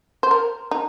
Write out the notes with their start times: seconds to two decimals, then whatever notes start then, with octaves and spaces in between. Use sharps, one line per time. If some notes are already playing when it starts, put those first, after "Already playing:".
0.23 C5
0.31 A#4
0.71 D#4